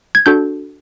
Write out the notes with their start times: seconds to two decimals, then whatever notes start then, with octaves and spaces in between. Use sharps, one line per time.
0.15 G#6
0.26 D4 F#4 A4 G6